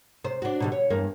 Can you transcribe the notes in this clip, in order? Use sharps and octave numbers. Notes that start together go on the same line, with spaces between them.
C3 C5
D4 F#4
B2 D3 G3
C#5
E2 G2 A#3